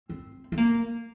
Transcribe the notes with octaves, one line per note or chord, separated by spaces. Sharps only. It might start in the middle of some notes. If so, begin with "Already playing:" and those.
C4
C4
A#3